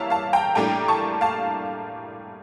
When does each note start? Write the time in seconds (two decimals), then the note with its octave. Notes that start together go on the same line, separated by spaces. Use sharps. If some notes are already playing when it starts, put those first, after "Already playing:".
Already playing: E3 G3 A#3 A#4 C#5 E5 F5 A5
0.10 F5 A5
0.33 G5 A#5
0.55 A2 G3 A#3 D4 G5 A#5
0.88 A5 C#6
1.21 F5 A5